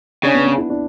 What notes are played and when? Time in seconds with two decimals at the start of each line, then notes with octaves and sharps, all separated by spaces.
0.23 C#3 D4
0.34 B3
0.46 B3
0.58 E4
0.70 D4